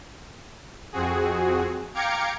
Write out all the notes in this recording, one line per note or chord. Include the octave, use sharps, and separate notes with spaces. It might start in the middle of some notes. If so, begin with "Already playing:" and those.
F2 C4 F#4 G#4
F5 G5 A#5 D6 G#6 C#7